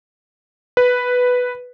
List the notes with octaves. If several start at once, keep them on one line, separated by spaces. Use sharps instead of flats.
B4